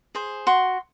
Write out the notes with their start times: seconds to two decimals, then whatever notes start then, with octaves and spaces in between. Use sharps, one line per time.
0.15 G#4 C5
0.47 F#4 C6